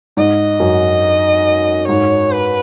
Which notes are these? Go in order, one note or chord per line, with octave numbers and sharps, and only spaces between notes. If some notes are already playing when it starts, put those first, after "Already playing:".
G#2 D#5
F#2
G#2 C#5
B4